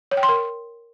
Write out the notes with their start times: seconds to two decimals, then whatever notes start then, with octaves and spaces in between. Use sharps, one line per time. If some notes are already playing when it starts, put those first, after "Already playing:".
0.11 C#5
0.17 G5
0.23 C6
0.29 A#4